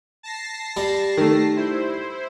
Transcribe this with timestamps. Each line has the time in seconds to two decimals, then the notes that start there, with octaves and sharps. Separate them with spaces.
0.23 A5 A#6 C7
0.77 G3
1.18 D#3 A3
1.56 E4 C5